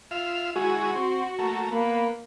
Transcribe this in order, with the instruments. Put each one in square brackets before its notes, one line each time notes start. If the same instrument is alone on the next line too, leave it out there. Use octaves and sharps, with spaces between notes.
[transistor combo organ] F4 E5 F5
[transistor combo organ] G#3 E4 G#4 [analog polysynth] F#4
[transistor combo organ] C4
A3 A#3
[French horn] A#3 [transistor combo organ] B3